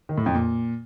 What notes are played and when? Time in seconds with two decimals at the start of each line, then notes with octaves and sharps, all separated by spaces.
0.09 D#3
0.18 A2
0.26 F2
0.34 A#2